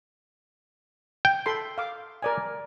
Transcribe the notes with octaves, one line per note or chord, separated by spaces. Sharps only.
G5
A4 B5 C6
F5 D6
A#4 D5 G#5